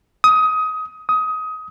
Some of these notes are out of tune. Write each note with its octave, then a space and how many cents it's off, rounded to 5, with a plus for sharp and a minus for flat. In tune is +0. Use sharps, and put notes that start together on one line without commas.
D#6 +20
D#6 +20